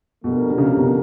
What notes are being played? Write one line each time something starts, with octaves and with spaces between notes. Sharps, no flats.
B2 F3 A3 D4 G4 A#4
C3
C#3
C3
B2